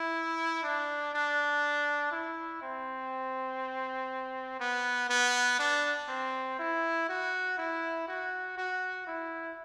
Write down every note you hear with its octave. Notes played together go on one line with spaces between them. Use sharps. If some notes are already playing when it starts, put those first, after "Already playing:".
Already playing: E4
D4
D4
E4
C4
B3
B3
D4
C4
E4
F#4
E4
F#4
F#4
E4